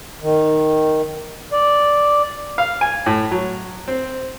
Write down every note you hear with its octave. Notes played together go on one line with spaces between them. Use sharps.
D#3
D5
F5
G#5
A2
F#3
C4